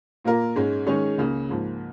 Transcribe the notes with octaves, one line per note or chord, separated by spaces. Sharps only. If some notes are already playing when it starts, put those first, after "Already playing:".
A#2 A#3 F4 A#4
G#2 G#3 C#4
D#3 G#3 C#4 G#4 C#5
C#2 C#3 A#3
G#2 F3 A#3